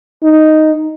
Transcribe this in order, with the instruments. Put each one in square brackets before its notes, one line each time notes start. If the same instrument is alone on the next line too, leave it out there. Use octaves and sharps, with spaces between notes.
[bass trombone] D#4